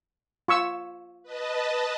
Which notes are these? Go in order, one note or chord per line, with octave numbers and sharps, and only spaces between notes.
F4 C#6 E6
B4 D#5 A5